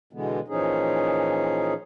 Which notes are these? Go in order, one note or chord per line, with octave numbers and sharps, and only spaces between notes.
B2 D3 E3 G#3 B3
A#2 E3 F3 C#4 D#4 G#4